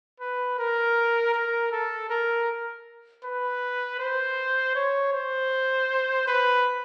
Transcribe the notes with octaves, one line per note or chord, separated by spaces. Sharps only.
B4
A#4
A#4
A4
A#4
B4
C5
C#5
C5
B4